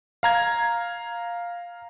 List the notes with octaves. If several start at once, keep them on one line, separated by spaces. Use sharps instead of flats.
F5 A#5 G#6